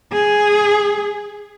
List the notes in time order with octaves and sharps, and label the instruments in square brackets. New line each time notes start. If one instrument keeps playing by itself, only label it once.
[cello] G#4